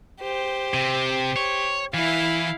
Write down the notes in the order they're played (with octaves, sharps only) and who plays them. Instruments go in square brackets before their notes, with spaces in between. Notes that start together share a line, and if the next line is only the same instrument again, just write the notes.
[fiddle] G4 C5
[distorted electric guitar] C3
C#5
[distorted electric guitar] E3 [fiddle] E4 F5